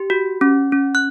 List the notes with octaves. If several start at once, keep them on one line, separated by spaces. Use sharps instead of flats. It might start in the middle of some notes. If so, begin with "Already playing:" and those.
Already playing: G4
F#4
C#4
C#4
F#6